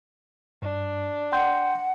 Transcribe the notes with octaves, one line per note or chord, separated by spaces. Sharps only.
G2 D4
F#5 G5 C6 G6